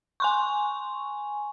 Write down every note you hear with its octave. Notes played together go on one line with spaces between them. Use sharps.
G#5 C6 C#6